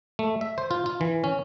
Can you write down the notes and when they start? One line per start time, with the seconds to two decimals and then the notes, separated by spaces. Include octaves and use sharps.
0.19 A3
0.41 E5
0.58 C5
0.71 F4
0.86 F4
1.01 E3
1.24 C#4